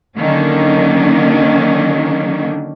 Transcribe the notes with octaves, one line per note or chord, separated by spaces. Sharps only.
D3 D#3 F#3 A#3 C#4 D4